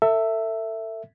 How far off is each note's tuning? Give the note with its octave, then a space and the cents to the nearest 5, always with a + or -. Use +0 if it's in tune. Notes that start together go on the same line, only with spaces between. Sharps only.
A4 +30 E5 +5